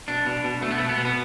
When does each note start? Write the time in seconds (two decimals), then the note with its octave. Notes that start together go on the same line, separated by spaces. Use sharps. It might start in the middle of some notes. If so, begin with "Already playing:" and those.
0.08 B2 D4
0.26 B2
0.44 B2
0.61 B2 A3
0.71 B3
0.78 B2 A3
0.89 B3
0.98 B2
1.05 B3